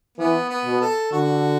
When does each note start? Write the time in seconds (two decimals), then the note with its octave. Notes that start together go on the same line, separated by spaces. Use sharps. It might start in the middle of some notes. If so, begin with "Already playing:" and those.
0.18 E3 B3
0.50 B3
0.65 B2
0.81 A4
1.12 D3 F#4